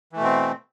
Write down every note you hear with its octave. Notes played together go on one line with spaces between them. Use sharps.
B2 E3 A3 C4